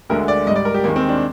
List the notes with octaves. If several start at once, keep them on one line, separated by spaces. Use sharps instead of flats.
D2 D3 G#3 A#4
D5
G#2 G3 D5 D#5
A#4
G4
D#2 D#3 G#3 A#3
C4
D4